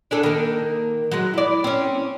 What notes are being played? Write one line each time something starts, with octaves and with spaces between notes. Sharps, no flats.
D4 G#4 A4
D#3 A#3
F#3 G#3
E4 D5
C4 C#4